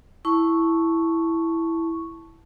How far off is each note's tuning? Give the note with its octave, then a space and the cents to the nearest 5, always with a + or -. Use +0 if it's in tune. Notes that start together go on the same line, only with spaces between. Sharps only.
E4 +0 A5 +0 C#6 +0